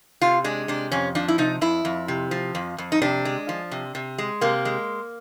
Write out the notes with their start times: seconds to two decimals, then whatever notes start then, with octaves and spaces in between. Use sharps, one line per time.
0.22 C3 F4
0.44 G#3 D4
0.68 C3 D4
0.92 F2 C#4
1.15 F3 D4
1.28 E4
1.38 C3 D#4
1.61 F2 E4
1.85 F2
2.08 C3
2.31 F3
2.55 F2
2.78 F2
2.92 D#4
3.02 C3 D4
3.25 G#3
3.49 F3
3.71 C3
3.95 C3
4.18 G#3
4.41 C3 A#3
4.65 G#3